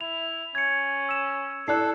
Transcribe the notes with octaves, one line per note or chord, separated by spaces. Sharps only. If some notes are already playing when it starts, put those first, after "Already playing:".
E4 F7
C#4 G#6 C#7
E6 E7
E4 A4 D5 F#6 C7